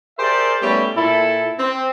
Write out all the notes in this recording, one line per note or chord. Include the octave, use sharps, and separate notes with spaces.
G4 G#4 A#4 C5 D5 E5
G3 A3 B3 C#4 E4 G4
A#2 E4 A4
C4